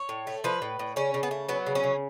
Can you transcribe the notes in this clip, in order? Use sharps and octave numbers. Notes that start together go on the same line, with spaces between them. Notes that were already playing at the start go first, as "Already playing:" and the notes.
Already playing: C#5
A2
A3
F3 B4
A2
A2
C#3 C#4
C#3
B3
A3
F#3 B3
C#3
C#4
C#3